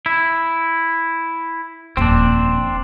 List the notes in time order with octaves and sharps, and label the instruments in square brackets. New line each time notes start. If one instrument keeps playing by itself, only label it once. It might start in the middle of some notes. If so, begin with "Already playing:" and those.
[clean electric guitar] E4
[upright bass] D#1 F2 [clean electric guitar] C4 D4